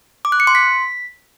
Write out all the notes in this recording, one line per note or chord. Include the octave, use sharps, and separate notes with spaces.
D6
F#6
C#7
C6
B6